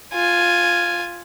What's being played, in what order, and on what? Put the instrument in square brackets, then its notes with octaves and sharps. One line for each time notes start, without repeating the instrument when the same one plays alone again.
[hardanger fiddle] F4 G#5